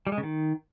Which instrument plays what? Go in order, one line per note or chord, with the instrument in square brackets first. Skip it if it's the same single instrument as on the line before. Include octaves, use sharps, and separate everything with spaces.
[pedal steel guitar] G3
G#3
C#3
D#3